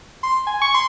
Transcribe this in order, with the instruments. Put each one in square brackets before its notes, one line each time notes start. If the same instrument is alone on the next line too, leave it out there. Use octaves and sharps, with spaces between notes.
[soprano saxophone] C6
G#5
C#6
C6